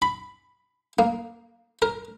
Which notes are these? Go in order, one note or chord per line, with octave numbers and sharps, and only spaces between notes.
B5
A#3
A#4